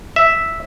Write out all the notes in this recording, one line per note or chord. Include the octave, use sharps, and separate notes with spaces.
E5